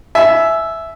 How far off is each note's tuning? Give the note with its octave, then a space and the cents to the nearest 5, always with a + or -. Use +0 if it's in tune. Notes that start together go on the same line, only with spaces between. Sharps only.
E5 +0 G#5 +30